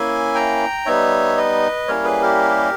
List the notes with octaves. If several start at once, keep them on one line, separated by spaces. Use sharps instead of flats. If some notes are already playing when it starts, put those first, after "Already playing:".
Already playing: A#3 C#4 E4 E5 G#5
G5 A#5
G3 B3 D#4 C#5 E5
B4 D#5
G3 A#3 C#4 E4 A#4 C#5
G#4 B4
G4 A#4